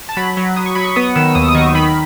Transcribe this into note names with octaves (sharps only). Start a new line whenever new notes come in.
A5
F#3 B5
F#3
F#3 D#6
C#6
F#3 B5
C#6
B3 D#6
D#3 E6
D#2 D#6
D#6
D#3 C#6
D#3 B5